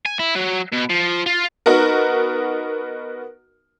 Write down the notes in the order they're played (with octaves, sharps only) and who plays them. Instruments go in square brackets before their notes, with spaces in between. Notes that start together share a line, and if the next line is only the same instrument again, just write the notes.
[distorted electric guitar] G#5
E4
F#3
B2
F3
F4
[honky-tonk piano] B3 D#4 F#4 A#4